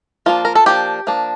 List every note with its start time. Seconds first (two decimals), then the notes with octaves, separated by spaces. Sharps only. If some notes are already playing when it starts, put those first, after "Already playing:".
0.26 F3 A#3 D4 F4
0.45 A#4
0.55 A4
0.66 F3 A#3 D4 G4
1.07 F3 A#3 D4